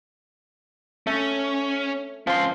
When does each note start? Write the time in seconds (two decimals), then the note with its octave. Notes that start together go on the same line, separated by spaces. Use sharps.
1.07 A3 C#4
2.27 F3 C#4 C6